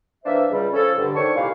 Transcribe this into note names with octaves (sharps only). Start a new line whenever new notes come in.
E3 A#3 D4 C5 E5
C#2 G3
C#3 F3 C#4 A4
G2 D3
D#3 D4 A4 C5 C#5 C#6
C2 A#2 D#3 E4 G4 F5